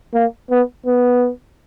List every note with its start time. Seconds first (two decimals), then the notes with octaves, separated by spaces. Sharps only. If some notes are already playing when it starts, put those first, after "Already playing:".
0.14 A#3
0.51 B3
0.86 B3